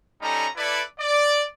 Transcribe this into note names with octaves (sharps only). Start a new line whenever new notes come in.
G3 C#4 D#4 A4 A#5 B5
E4 A4 B4 D5
D5